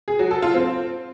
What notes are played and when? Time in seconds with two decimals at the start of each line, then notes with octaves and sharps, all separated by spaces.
0.08 G#4
0.19 F#3
0.31 A4
0.42 F4
0.54 C4